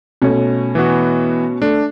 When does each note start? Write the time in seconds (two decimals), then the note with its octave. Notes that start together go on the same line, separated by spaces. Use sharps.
0.22 B2 A3 C#4
0.75 E3 B3 F#4
1.62 A3 D4